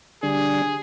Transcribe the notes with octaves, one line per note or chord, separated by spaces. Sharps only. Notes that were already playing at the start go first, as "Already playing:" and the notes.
D3 G3 D4 G#4